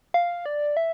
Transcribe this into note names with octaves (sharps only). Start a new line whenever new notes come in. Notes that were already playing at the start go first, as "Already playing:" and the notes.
F5
D5
E5